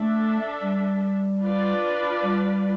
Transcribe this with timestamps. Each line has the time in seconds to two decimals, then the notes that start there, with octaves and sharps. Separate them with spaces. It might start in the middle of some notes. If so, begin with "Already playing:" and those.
Already playing: A3 D4 A4 E5
0.61 G3
1.41 D4 F4 B4 D5
2.22 G3